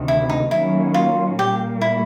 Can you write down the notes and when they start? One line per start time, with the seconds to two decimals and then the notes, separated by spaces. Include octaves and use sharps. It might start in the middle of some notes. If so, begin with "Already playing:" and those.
Already playing: D2 C3 D#3
0.08 E4
0.30 D#4
0.51 D#3 F#3 A#3 C#4 E4
0.94 F4
1.38 A#2 G3 A#3 G4
1.81 E4